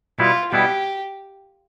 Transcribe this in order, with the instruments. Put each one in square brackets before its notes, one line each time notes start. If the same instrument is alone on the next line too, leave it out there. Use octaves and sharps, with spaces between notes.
[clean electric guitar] B2 G3 B3 E4 [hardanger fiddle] F4
[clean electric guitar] B2 G3 B3 E4 [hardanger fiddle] G4